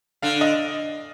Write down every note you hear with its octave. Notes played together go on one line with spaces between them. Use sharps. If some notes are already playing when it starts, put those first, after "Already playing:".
D3 F5
D#5